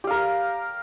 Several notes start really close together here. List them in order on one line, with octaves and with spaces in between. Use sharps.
G4 F5 A#4